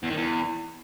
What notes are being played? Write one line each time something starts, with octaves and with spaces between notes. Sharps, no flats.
E2
D#3
E2